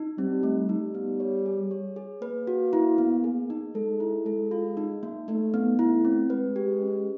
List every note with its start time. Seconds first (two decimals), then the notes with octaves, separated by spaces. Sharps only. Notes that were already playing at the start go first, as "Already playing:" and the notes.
Already playing: D#4
0.18 G3 C4
0.43 A3
0.69 G3 D#4
0.95 B3
1.20 C#5
1.46 G#4
1.71 C#5
1.96 G#4
2.22 A#3 B4
2.47 F#4
2.73 E4
2.98 B3
3.24 G#4
3.50 D#4
3.75 G#3 A4
4.00 E4
4.26 G#3 A4
4.51 F4
4.77 D#4
5.03 A#3
5.28 A3 D#4
5.54 B3
5.79 A3 E4
6.05 C4
6.30 G#3 B4
6.56 G4
6.81 C#4